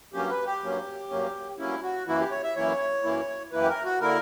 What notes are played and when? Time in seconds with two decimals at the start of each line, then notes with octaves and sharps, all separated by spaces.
0.13 G2 F#3 A#3 C#4 G4
0.30 B4
0.46 G4
0.62 G2 F#3 A#3 C#4
1.10 G2 F#3 A#3 C#4
1.59 G2 F#3 A#3 C#4 E4
1.83 F#4
2.07 F#2 E3 A#3 E4 F#4
2.20 G4
2.31 C#5
2.44 E5
2.56 F#2 E3 A#3 E4 C#5
3.04 F#2 E3 A#3 E4
3.52 F#2 E3 A#3 E4 B4
3.62 G4
3.69 A#4
3.84 F#4
4.01 D3 A#3 E4 A#4